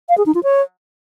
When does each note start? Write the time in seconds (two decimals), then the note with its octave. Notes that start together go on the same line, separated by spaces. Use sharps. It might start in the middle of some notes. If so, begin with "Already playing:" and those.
0.09 F5
0.17 G#4
0.26 D#4
0.35 F4
0.43 C#5